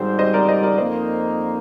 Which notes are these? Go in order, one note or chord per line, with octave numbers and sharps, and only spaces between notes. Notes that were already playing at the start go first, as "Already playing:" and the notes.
Already playing: G#1 G#2 G3 C4 C5
C5 D#5
A#4 D5
C5 D#5
A#4 D5
F2 D#3 A#3 C5 D#5